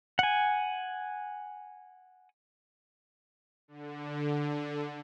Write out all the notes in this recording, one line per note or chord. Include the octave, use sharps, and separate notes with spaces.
F#5 G#5
D3